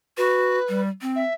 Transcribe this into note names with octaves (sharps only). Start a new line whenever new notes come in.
F#4 B4
G3
C4
E5